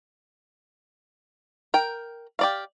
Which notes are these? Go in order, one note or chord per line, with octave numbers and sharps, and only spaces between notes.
A#4 G5
G4 D5 F5